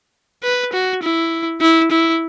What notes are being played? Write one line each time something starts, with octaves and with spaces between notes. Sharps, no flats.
B4
F#4
E4
E4
E4